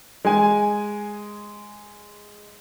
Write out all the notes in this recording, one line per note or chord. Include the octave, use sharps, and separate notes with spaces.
G#3 G#5